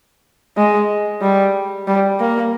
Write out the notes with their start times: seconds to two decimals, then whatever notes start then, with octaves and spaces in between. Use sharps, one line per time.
0.57 G#3
1.22 G3
1.87 G3
2.20 A#3